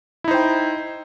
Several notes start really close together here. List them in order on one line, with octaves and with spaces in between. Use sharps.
E4 D#4 C5 G5